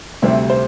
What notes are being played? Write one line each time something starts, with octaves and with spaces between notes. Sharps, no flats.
D2 C3 G3 C4 E5
C5